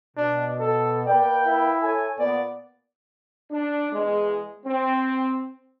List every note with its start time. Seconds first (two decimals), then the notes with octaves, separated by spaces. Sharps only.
0.17 B2 D4
0.60 A4
1.06 A#3 B4 D5 G5
1.46 E4
1.82 A4 C#5 G#5
2.19 A#2 B3 D5
3.51 D4
3.92 E2 G#3
4.66 C4